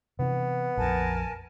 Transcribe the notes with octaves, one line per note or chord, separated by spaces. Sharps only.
C3 E3 B3
A#1 F2 A#4 G#5 A5